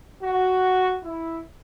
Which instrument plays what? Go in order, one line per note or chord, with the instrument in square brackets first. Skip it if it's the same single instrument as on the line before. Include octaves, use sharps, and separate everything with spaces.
[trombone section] F#4
E4